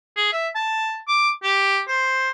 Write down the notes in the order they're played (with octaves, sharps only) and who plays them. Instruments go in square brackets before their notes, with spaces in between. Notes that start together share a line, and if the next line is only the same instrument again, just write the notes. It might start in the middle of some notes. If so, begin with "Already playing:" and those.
[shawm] G#4
E5
A5
D6
G4
C5